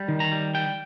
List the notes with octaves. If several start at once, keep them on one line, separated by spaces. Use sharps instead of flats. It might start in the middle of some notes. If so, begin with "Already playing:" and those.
Already playing: G3
D#3
A#5
G3
G3 G5